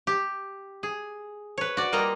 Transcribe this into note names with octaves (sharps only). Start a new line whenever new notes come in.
G4
G#4
B4 C#5
F#4 D5
G3 A#3 F4 D#5 A#5